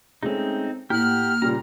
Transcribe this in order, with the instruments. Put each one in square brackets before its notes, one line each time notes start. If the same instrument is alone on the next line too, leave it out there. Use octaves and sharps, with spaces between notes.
[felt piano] G#3 A3 C#4 [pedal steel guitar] C4 D#4
[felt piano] A2 [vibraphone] A#3 [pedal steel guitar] G4 F#5 [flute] F6
[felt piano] A#2 C#3 G3 [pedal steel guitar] A#5